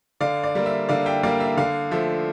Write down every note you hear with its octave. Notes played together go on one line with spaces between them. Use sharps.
D3 D5 F5
D5
G3 A#3
E5
D3 D5 F5
E5 G5
G3 A#3 D5 F5
E5
D3 D5 F5
F3 A3 E5